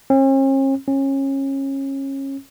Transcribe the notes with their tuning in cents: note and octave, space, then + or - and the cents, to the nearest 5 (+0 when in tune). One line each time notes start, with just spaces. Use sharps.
C#4 -45
C#4 -25